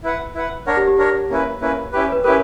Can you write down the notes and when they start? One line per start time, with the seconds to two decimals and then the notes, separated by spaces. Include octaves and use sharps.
0.03 E4 B4 F#5
0.35 E4 B4 F#5
0.67 D4 A#4 C#5 F#5
0.77 G4
0.88 G4
0.98 D4 A#4 C#5
1.30 A#3 C#4 E4 B4
1.61 A#3 C#4 E4 B4
1.93 C#4 E4 G4 B4
2.12 B4
2.24 C#4 E4 G4 A#4 B4